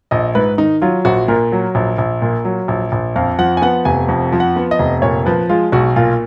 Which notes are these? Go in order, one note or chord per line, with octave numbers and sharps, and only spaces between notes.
A#1 D#5
G#2 B4
D#3 D#4
F#3 F4
A#1 F#4
A#2 A#4
F#3
A#1
A#1
A#2
F#3
A#1
A#1
F2 F5
F3 F#5
G#5
B3 F#5
F1 G#5
F2
F3
F#5
B3
D#5
F1
A#2 C#5
F3 B4
G#3 F4
B1 F#4
A#2 F4